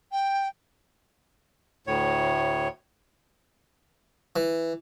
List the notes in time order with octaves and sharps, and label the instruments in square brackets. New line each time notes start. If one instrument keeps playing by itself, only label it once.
[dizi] G5
[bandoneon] D2 A2 C#5
[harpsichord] E3